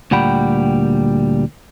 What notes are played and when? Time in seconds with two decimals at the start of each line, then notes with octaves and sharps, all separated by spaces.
0.11 D2 A#2 G3 F#5 G5 B5